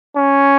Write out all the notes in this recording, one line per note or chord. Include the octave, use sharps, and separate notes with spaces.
C#4